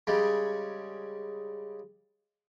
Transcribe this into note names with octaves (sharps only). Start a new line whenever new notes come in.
C#3 G3 G#3